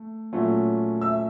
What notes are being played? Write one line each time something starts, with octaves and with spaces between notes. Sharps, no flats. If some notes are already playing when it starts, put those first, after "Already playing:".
Already playing: A3
A#2 F#3 A3 C#4
E5 E6